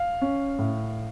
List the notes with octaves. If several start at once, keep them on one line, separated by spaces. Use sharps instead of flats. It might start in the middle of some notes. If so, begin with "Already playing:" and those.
Already playing: F5
C#4
A2